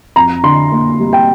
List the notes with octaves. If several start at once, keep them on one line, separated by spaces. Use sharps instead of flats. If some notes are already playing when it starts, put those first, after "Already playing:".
F2 A#5
D3 C6
A#3
G3
G5